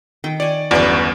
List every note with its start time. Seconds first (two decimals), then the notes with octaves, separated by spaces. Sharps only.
0.24 D#3 G5
0.40 C#5 D5 G#5
0.71 G1 E2 F#3 B3 C#4 D5